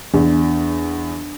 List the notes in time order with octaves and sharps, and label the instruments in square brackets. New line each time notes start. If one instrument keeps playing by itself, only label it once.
[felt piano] E2 [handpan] D4